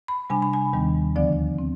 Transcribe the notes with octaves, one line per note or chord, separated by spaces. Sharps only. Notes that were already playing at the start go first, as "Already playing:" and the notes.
B5
C3 G3 D4 G#5
B5
G#5
D#2 D#3 G3 B3 D4
D2 D3 F3 B3 D4 D5
C4